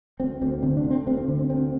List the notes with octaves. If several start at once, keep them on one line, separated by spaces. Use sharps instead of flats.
D2 C4
D2 C4
D3 C4
D4
D3
C4
D2 C4
C4
D3
C4
D2 C4